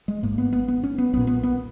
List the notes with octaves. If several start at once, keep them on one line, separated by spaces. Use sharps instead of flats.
G#3
G#1 G#2 A#3
B3
B3
B3
C#4
B3
B1 A#2 B3
B3
B3